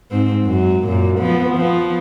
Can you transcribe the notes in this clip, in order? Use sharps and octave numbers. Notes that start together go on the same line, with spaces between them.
G#2 C4
F#2 F#3
F#2 A#2
F3 B3
F3 B3